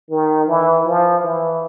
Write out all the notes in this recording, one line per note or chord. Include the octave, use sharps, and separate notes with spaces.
D#3
E3
F3
E3